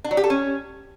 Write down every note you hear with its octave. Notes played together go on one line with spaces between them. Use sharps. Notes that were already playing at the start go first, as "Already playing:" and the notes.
D4
F#3
G4
A4
C#4